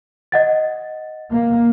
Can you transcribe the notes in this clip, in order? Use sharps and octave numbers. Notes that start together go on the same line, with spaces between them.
D#5 F#5 A6
A#3